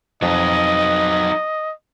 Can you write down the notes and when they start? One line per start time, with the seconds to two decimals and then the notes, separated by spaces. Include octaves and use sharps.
0.23 F2 F#3 D#4 D#5